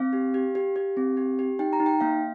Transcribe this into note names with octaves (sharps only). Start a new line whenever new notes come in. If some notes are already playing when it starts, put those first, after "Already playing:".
Already playing: C4 F5
G4
G4
G4
G4
C4
G4
G4
D#4 G5
A#5
D#4
G5
A#3 F5